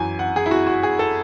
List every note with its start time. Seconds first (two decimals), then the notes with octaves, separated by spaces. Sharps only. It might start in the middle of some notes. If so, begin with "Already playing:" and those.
Already playing: F#2 E3 G#5
0.19 F#5
0.36 G#4
0.46 E4
0.51 F#4
0.67 F#4
0.83 G#4
0.99 A4